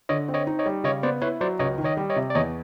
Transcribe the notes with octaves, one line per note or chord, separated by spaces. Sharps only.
D3 C#5 D#5
C4
C#5 D#5
D#4
C#5 D#5
G3
C#3 C#5 D#5
B3 C5 D5
E4 B4 C#5
F#3 C5 D5
C#2 C#5 D#5
D#3
C#5 D#5
G3
C#5 D#5
C3
D5
E2 C#5 D#5